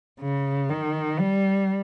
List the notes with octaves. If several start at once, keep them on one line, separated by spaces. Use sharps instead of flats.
C#3
D#3
G3